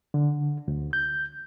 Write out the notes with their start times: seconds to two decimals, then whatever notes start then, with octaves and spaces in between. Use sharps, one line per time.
0.14 D3
0.68 D2
0.93 G6